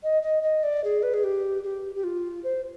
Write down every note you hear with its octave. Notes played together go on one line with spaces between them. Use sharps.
D#5
D#5
D#5
D5
G#4
B4
G#4
G4
G4
G4
F4
C5